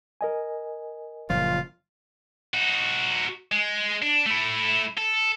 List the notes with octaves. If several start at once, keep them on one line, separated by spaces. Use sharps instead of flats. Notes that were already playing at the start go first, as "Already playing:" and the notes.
A#4 D#5 G#5
F#1 A#2 F3 F4
D#4 F#4
G#3
D4
A3 E4
A4